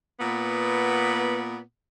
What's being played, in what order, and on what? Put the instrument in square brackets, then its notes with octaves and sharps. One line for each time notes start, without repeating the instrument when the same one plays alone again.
[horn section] A#2 B3